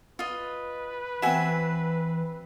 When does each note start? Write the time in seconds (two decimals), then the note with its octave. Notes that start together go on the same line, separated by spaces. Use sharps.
0.19 F4 B4 D#5
1.22 E3 C4 F#4 E5 G#5